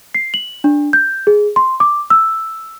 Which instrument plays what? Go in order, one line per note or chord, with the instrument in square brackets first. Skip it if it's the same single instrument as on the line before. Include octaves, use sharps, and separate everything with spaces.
[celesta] C7
F#7
D4
G6
G#4
C6
D6
E6